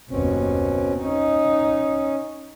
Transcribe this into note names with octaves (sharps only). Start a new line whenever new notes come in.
F#1 D#2 B2 C4 C#4
C#4 D#4